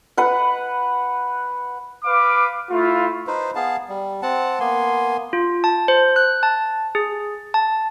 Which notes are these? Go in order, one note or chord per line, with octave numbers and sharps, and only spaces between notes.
B4 F#5
B4 F5 D6
A3 E4 F4
D#4 B4 C5
B3 G#4 F5 A5
G3
C4 F#5 A5
A#3 B3 G#5 C6
F4
A5
C5
F#6
A5
G#4
A5